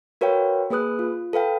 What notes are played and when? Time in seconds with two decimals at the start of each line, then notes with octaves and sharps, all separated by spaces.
0.21 F#4 A#4 B4 C#5 F5 G5
0.70 A#3 G#4 B4 D#6 F#6
0.99 F4
1.33 A4 B4 F5 G5